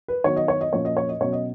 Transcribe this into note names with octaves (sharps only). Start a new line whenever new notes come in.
B4
D#3 F#3 B3 C#5
D#5
C#5
D#5
A#2 F3 A#3 C#4 C#5
D#5
C#5
D#5
B2 F#3 C#4 C#5
D#5